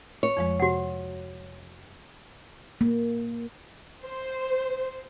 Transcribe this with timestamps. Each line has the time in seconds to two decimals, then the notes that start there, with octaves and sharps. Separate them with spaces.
0.23 C#5
0.37 F2 F3 G#3
0.60 C3 F#4 F#5
2.81 A#3
4.05 C5